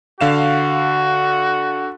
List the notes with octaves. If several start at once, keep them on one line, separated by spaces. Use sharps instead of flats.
D3 F#4 F5 E7